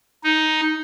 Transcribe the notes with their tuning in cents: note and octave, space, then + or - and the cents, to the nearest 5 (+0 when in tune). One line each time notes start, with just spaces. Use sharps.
D#4 +5